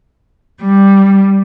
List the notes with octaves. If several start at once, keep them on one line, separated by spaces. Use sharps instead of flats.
G3